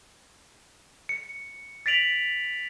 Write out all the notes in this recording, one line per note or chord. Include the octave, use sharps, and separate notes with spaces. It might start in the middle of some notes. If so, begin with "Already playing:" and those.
C#7
A6 B6 D7 F7 F#7